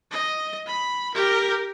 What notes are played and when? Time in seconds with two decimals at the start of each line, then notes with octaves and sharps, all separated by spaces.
0.11 D#5
0.67 B5
1.14 G4 A#4